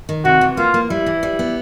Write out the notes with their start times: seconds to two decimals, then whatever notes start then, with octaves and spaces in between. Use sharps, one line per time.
0.09 D#3
0.25 C3 F#4
0.41 E3
0.57 A#3 F4
0.74 A#3
0.90 G3 E4
1.06 E3
1.23 G3
1.39 B3